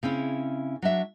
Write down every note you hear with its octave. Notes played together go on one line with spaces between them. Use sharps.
C#3 C4 C#4 E4
F#3 D4 E5